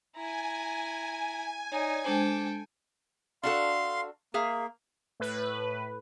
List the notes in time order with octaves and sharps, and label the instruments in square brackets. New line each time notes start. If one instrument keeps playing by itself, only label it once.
[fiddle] E4 A#5 [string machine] G#5
[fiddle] D#4 [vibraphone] C#5 D5
[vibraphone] G#3 D4 C5 [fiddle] A4 G5
[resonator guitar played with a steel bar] D4 F#4 A4 [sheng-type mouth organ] F5 C6
[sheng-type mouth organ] A#3 [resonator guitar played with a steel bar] G#4 E5 F5
[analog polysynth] A2 B4